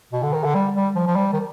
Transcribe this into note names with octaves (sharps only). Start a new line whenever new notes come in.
B2
D3
D#3
D3
G3
G3
F3
F3
G3
D#3